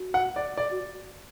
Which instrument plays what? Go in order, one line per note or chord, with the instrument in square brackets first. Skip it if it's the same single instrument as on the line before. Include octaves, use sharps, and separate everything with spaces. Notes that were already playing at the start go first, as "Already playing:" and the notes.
Already playing: [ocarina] F#4
[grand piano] F#5
D5
D5
[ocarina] F#4